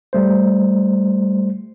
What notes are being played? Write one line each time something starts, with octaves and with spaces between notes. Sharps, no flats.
G3 A3 C5